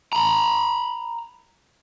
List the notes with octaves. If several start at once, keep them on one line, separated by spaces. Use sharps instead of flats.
A#5 B5